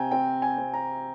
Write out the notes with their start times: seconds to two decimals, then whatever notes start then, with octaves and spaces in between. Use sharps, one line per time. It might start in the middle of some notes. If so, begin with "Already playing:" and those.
Already playing: C3 C4 G5 G#5 A#5
0.11 C4 G5
0.42 G#5
0.58 C4
0.74 A#5